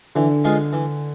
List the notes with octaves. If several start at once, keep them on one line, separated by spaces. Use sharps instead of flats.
D3 E3
G#3 B3 F4 G#4
E3